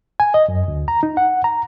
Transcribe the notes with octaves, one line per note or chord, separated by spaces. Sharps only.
G#5
D#5
F#2
D2
A#5
D#4
F#5
A#5